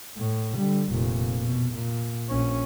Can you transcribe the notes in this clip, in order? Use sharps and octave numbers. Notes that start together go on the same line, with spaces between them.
A2
D3 G3
F1 A#2
B2
A#2
A#1 C#4